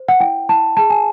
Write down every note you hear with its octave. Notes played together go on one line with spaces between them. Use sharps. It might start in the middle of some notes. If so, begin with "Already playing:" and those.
Already playing: C5
F#5
E4 G5
E4 A5
G#4 A5
G#5